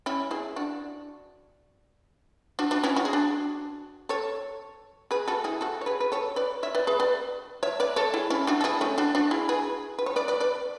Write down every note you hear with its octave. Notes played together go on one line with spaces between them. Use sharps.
C#4 E4
E4 G#4
D4 F#4
D4 F#4
D4 F#4
C#4 E4
F#4
G#4
D4 F#4
A4 C#5
G#4 B4
F#4 A4
E4 G#4
F#4 A4
C#5
G#4 B4
B4
A4 C#5
B4 D5
C#5 E5
B4 D5
G#4 B4
B4 D5
C#5 E5
B4 D5
A4 C#5
E4 G#4
C#4 E4
D4 F#4
A4
E4 G#4
A3 C#4
D4 F#4
D4 F#4
E4 G#4
G#4 B4
B4
C#5
B4 D5
B4 D5
B4 D5